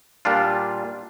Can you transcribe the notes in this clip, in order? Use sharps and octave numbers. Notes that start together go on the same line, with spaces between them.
A#2 G3 D4 F4